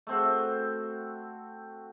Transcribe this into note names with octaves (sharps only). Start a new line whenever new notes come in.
A3 C4 F#4